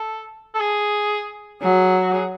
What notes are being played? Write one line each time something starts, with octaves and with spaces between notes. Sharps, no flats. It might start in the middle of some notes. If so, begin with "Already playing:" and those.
Already playing: A4
A4
G#4
F#3 G#4
F#4
G#4